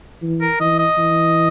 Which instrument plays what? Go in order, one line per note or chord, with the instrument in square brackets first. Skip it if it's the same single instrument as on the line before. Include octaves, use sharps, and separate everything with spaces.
[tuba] E3
[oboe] A#4
[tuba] E3 [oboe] D#5
[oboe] D#5
[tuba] E3